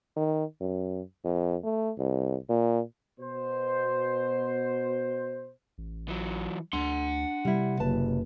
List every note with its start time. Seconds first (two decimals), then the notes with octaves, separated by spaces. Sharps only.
0.16 D#3
0.61 F#2
1.24 F2
1.64 A3
1.98 C2
2.49 A#2
3.20 B2 C5
5.78 A1
6.08 E3 F#3
6.73 D2 D4 F#5 C6
7.45 C3 G3 E4
7.80 F#1 B4 A5